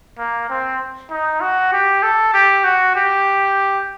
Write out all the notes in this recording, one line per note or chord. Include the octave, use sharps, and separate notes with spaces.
A#3
C4
D#4
F#4
G4
A4
G4
F#4
G4